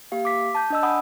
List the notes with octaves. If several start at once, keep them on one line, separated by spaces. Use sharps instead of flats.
A#3 G4 F5
D6 B6
A5 G6
D4 D#5 E6
F#5 G#5 B5 D#6